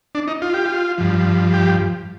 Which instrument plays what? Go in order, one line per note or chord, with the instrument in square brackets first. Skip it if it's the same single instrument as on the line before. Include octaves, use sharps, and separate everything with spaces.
[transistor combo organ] D4
D#4
F4
G4
F4
G2 F3
G4